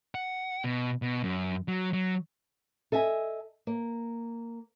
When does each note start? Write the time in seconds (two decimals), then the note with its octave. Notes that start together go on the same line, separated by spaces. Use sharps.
0.15 F#5
0.64 B2
1.02 B2
1.23 F#2
1.68 F#3
1.93 F#3
2.92 A4 D#5 E5 G#5
3.67 A#3